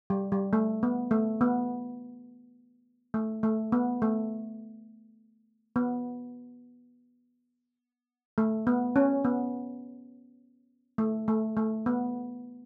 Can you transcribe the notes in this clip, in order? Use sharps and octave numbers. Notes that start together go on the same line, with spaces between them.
G3
G3
A3
B3
A3
B3
A3
A3
B3
A3
B3
A3
B3
C#4
B3
A3
A3
A3
B3